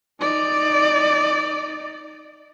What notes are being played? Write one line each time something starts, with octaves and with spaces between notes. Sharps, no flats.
D#4 D5